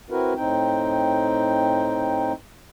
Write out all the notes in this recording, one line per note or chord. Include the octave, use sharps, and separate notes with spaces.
C4 E4 F#4 A#4 B4
A2 C4 D#4 G5